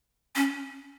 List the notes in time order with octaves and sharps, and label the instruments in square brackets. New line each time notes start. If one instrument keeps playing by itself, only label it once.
[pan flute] C#4